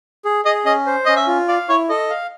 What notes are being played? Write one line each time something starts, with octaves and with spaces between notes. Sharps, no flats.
G#4
G#4 D#5
C#4 D#5
C5
C#4 D#5
E5
F4
D5 F5
E4 C#5
A4 D#5
F5